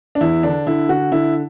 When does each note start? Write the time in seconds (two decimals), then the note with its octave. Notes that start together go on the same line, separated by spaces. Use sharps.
0.15 D4
0.21 E2 E4
0.43 D3 D4
0.67 D3 E4
0.89 D3 F#4
1.12 D3 E4